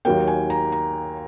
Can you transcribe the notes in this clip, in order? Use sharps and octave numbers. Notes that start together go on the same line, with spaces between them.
D#2 D#3 F#3 A#3 G5
G#5
A#5
A#5